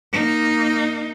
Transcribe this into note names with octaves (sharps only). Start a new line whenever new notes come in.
A#3 D#4